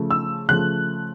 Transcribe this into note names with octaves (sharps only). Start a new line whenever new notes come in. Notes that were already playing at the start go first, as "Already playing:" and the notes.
Already playing: C#3 F3 A3
E6
C#3 F3 A3 F#6